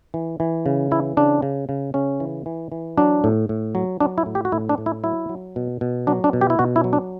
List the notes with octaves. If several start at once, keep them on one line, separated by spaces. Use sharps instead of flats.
E3
E3
C#3
E3 E4
C#3 D4
C#3
C#3
C#3 C#4
E3
E3
E3
F#3 D4
A2
A2
F#3
F#3 D4
E4
A2
G4
F#4
A2 E4
D4
A2
E4
F#3 E4
F#3
B2
B2
F#3 D4
D4
B2
G4
E4
B2 F#4
E4
F#3
D4